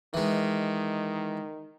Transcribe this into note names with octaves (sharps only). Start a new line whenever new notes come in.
D#3 E3 G#3